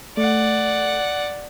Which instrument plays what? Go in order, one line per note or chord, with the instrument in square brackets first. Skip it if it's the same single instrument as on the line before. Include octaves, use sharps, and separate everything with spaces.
[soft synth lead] A3 [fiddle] D5 F#5